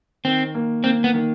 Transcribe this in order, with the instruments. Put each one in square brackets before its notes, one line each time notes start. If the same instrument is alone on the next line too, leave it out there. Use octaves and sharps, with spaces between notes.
[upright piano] D#3 [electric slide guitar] C4
[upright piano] A#3
[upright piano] A#3 [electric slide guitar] C4
[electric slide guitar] B3
[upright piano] D#3